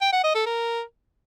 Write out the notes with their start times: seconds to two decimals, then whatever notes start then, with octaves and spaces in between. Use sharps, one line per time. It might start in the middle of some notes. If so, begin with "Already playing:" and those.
0.02 G5
0.13 F#5
0.24 D#5
0.35 A4
0.46 A#4